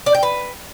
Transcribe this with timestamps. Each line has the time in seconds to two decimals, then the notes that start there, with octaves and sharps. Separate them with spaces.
0.06 D5
0.15 G5
0.23 B4